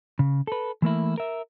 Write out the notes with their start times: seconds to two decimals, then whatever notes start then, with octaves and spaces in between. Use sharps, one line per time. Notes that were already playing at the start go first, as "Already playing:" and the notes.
0.19 C#3
0.47 A4 B4
0.82 E3 A3 A#3 E4
1.18 A#4 E5